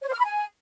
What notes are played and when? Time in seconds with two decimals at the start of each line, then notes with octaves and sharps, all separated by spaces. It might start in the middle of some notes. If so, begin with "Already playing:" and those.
0.02 C#5
0.08 C5
0.14 F6
0.19 B5
0.25 G#5